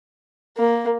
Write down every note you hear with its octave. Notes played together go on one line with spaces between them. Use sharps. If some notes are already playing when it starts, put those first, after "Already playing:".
A#3